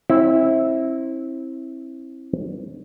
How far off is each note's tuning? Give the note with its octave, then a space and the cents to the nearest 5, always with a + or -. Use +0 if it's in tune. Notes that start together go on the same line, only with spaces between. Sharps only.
C4 +30 E4 -15 F#5 +25